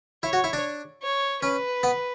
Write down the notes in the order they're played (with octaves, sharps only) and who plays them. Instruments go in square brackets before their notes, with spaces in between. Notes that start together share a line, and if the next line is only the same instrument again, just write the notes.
[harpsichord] E4 [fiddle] C#5
[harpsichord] F#4
E4
D4
[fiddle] C#5
[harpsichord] C#4 [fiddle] B4
[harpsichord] B3